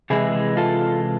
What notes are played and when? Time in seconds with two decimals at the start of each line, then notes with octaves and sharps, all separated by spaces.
0.10 C3 E3 G#3 E4 G#4
0.57 F4 A4